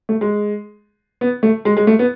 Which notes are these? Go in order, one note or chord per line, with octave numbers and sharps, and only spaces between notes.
A3
G#3
B3
A3
G#3
G#3
A3
B3